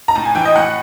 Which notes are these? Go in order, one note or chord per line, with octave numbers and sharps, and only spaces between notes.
A#5
A2 A5
G#5
E3 G5
D#5
A2 F#5